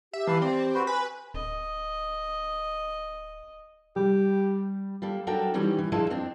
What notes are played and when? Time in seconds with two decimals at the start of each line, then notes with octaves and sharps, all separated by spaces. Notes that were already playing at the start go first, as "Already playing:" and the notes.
0.13 G4 E5
0.27 E3 B4 F5 A5
0.42 C4 D5
0.75 F#4 B4 C5
0.87 B4 G#5 B5
1.34 D1 D#5
3.96 G3 G4
5.02 G3 A#3 A4
5.27 F#3 D4 F#4 A4 A#4 G5
5.54 D#3 E3 G3 C#4
5.78 E3
5.92 D2 F3 G#3 A#3 E4 A5
6.10 F2 C4 D4